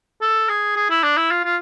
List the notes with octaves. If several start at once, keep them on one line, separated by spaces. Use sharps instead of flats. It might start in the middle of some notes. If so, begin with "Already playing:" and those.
A4
G#4
G#4
E4
D4
E4
F4
F4